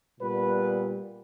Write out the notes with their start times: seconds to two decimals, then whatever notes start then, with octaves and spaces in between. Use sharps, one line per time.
0.20 A#2 G3 B3 B4